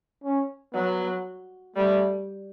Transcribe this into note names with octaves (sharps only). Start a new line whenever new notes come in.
C#4
F#3 B3
G3 A3